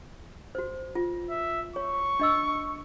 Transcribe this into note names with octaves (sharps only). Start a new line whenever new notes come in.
F#4 C5
F4
E5
C#5 C#6
D4 D#5 E6